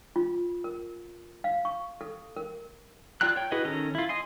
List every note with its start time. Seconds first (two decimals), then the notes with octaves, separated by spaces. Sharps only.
0.16 F4
0.64 A#4
1.44 F5
1.65 C#6
2.01 A4
2.36 A#4
3.21 F4 D5 G5 A#5 F#6
3.36 C#5 G5
3.52 E4 F#4 G#4 B4 D#5
3.65 D#3 C#4 A4 A#5
3.95 E4 F4
4.09 D#5 G#5 C6